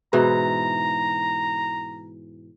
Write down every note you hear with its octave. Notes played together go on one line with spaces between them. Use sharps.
G#2 B2 E3 A#5